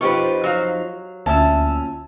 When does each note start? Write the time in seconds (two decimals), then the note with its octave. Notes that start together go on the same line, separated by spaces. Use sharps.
0.01 F2 F3 D#4 F4 G4 B4 C#6
0.44 F#3 F5
1.26 D2 A#2 C#4 E5 A5 E6